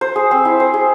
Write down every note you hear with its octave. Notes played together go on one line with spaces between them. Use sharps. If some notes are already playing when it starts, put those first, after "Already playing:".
C5
G#4
C4
E4
C5
G#4